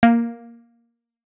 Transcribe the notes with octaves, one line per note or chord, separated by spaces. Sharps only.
A#3